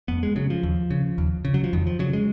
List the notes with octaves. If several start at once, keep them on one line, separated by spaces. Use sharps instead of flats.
F2 B3
G#3
C#3 F#3
F3
D#2
C#3
D#2
C#3
F#3
F3
F2 D#3
F3
C#3 F#3
G#3